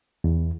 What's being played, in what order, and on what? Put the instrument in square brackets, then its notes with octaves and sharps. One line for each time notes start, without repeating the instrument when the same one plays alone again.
[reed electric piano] E2